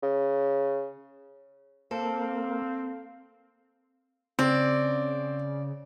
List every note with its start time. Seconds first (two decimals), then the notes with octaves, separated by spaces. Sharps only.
0.03 C#3
1.91 A#3 C4 A4 F5
4.39 C#3 C4 D5